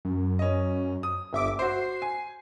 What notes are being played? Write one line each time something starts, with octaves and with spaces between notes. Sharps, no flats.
F#2
C#4 D#5
D#6
G1 E5 D6
F#4 C5 C7
G#5